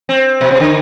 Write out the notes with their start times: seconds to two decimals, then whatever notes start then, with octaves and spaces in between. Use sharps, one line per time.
0.09 C4
0.41 B2
0.51 C3
0.60 D3